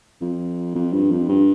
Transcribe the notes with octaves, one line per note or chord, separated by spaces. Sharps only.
F2
F2
G2
F2
G2